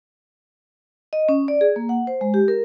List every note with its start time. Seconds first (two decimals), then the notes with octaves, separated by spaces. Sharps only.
1.13 D#5
1.29 C#4
1.48 D5
1.61 G#4
1.76 A#3
1.89 F#5
2.07 C5
2.21 G#3
2.34 G4
2.48 A#4